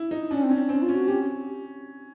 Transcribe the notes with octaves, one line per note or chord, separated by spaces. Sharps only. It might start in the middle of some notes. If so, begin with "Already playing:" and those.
Already playing: E4
D#4
C#4 D4
C4
C#4
C4
C4 C#4
F4
C#4
F#4
C#4 G4